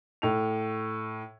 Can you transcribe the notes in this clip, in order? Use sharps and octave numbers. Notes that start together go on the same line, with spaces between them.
A2 F7